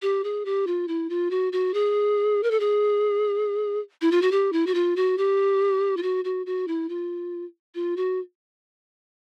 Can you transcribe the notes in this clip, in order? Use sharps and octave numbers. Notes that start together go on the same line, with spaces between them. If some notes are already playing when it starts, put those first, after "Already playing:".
G4
G#4
G4
F4
E4
F4
F#4
F#4
G#4
A#4
A4
G#4
E4
F4
F#4
G4
E4
F#4
F4
F#4
G4
F4
F#4
F#4
F#4
E4
F4
F4
F#4